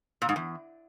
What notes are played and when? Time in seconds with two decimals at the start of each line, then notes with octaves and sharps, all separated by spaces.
0.22 A#2
0.29 G#2
0.36 E2